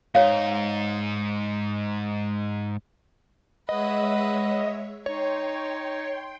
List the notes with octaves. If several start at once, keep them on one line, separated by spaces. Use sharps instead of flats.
G#2 D#4 C#5 F5
G#3 B4 C#5 D#5 E5 F#5
D#4 C#5 G5 C6